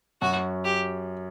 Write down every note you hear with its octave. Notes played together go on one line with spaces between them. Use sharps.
F#2 F#4
G4